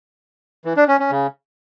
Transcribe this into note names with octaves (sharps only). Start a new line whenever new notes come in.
E3
D4
C#4
C#4
C#3